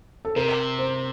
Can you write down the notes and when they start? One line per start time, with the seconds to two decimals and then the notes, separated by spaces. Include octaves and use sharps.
0.25 A4
0.36 C3 A#4
0.79 C5